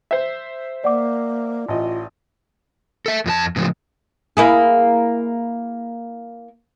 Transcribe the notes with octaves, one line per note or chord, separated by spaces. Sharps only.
C5 E5
A#3 D5 F#5 D6
A1 F4 D#5
A4 E5
F2 F4 A5
A2 C#3 F3
A#3 E4 G#4